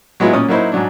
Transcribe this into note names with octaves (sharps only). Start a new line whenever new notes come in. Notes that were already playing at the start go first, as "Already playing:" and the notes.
F#3 G#3 B3 E4 F4
A#2 C#4 D#6
F#3 A#3 D#4 E4 F#4 C5
G#2 F#3 D4